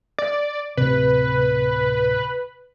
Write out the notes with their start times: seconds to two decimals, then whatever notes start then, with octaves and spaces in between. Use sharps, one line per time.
0.19 D5
0.77 D1 C3 B4